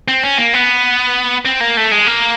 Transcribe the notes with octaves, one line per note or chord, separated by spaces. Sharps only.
C4
C#4
A#3
B3
C4
A#3
A3
G#3
A#3